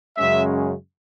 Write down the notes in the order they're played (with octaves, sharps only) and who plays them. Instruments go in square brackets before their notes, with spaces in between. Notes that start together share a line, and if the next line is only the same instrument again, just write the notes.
[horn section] F#2 C#3 G#3 C#4 E5